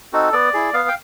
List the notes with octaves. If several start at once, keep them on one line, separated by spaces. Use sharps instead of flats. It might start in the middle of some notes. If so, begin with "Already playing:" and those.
C4 D#4 F#4 A4
B3 D5
E4 G#4
B3 F5
G5